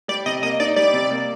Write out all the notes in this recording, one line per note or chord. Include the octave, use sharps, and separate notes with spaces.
G3 D5
C3 D#5
A#3 D#5
D#4 D5
G3 D5
C3
A#3